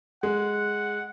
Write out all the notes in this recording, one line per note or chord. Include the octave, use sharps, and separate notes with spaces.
G#3 F#5